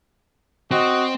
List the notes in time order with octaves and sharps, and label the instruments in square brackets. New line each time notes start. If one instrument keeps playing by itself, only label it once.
[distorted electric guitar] C4 [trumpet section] F#4 D#5